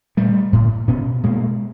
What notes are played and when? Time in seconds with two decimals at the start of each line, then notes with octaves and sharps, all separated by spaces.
0.17 A#2 G3 A3
0.53 A2
0.88 B2 B3 C#4
1.23 B2 G#3 A#3